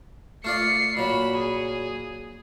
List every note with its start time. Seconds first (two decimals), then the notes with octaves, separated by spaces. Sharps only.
0.45 A3 F4 D5 C7 C#7
0.97 A#2 F#3 B5
1.36 G#4